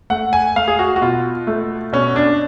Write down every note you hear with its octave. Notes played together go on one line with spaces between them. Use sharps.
A3 F#5
G#5
A3 F5
G#4
F#4
F#4
B2 F4
A3
B2 C#4
D4